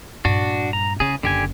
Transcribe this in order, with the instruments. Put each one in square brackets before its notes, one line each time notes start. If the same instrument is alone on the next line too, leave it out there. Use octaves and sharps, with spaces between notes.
[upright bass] G2 A#2 [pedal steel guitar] D4 F#4
[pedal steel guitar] A#5
[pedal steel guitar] C#3 G#4 [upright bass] E4
[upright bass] F#1 [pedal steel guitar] D3 G4 G#5